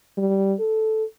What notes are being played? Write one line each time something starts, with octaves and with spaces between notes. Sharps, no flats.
G3
A4